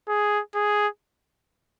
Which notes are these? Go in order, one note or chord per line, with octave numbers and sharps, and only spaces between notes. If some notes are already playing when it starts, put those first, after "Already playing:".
G#4
G#4